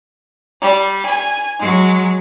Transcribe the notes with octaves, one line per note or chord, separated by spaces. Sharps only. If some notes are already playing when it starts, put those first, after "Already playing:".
G3
G#5
F#3 G#3